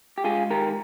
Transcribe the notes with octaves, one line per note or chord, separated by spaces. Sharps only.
G4
G#3 F4 G#4
D#3 G4 A#4